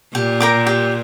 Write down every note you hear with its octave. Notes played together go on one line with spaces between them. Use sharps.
A#2 G4
A#4 G5 D6
G4